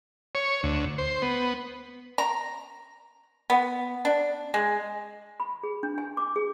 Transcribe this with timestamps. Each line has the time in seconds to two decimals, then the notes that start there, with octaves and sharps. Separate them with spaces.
0.35 C#5
0.63 D2
0.98 C5
1.22 B3
2.18 A#5
3.50 B3
4.05 D4
4.54 G#3
5.40 B5
5.63 G#4
5.83 D4
5.98 G#5
6.17 D6
6.36 G#4